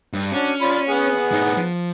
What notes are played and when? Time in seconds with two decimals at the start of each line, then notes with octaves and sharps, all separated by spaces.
0.13 G2
0.32 C#4 D4 F#4
0.62 F4 D5 B5
0.89 B3 G#4 F#5
1.32 A2 D#4
1.57 F3